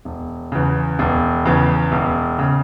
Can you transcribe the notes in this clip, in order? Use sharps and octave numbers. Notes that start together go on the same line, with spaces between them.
E1
E2 C#3
E1
E2 C#3
E1
C#3